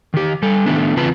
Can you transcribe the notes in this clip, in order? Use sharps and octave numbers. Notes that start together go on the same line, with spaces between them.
D#3 G4
G3 A4
D#3 A3 B3 D4
E2 C#3 C4 F4 B4 A5